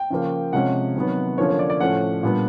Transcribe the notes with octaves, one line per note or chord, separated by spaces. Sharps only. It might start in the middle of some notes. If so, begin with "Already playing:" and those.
Already playing: G5
C#3 F3 A#3
C3 F3 G#3 C#4 F#5
C3 D#3 F#3 B3
D3 F3 A#3 C#4 C#5
C#5
D5
D5
A2 F3 A3 C#4 F#5
A#2 G3 B3 D4